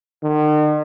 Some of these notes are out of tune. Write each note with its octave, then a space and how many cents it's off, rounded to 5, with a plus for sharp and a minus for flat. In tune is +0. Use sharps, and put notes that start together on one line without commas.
D#3 -45